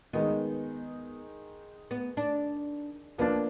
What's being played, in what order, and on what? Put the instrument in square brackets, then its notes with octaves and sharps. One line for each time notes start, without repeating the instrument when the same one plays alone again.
[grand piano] D#3 G#3 D#4 [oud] B3
[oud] B3
D4
[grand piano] F3 A#3 D4 [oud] B3